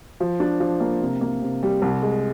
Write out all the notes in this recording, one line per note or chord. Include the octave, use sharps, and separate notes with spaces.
F3
D4
F3
A#3
C3
A#3
C3
G3
C2
G#3